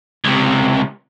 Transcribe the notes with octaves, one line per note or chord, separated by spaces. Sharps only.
C#2 C3